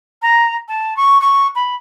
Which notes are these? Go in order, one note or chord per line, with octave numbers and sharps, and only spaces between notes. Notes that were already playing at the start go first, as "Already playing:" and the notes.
A#5
A5
C#6
C#6
B5